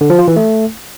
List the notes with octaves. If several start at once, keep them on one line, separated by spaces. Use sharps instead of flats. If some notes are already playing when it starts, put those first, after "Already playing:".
D3
F3
F4
E3
A3